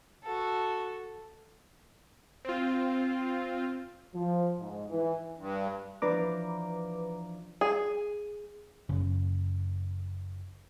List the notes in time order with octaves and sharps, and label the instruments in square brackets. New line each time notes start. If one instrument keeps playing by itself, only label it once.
[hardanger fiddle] F#4 A4
[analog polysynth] C4 F4
[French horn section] F3
G#2
E3
[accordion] G2
[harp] E3 F3 D4 [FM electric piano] B4 A#5 D6
[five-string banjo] G#4
[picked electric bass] F#1 C#3